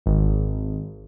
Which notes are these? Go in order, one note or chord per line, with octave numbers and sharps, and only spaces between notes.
G#1